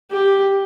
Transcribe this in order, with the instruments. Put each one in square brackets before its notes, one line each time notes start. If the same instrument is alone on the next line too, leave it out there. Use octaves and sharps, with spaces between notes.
[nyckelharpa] G4